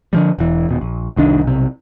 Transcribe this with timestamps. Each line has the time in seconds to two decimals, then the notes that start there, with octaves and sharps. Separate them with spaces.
0.13 D3 F3 G3
0.39 E1 E3
0.69 D#1 B2
0.81 A#1
1.16 F1 C2 D#3 D4
1.43 B1 C3